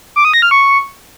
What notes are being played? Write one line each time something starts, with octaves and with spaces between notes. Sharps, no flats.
D6
D#6
A#6
F6
C#6